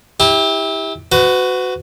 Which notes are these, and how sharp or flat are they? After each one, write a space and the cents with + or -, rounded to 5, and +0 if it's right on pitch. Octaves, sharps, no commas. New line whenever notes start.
E4 -25 G4 +20
F#4 +0 B4 +35